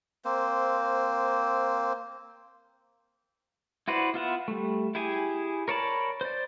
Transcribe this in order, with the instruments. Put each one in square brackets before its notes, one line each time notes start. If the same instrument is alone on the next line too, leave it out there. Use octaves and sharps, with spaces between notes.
[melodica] A#3 C4 C5
[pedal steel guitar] E4 F#4 B4 C5 D5
B3 F4 E5 F#5
G3 A3
E4 G4 G#4 G#5
A#4 C#5 D5 A5 B5
C5 D5